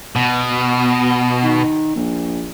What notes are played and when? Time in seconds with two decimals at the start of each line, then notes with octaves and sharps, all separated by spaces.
0.16 B2
1.43 D#3
1.96 A#1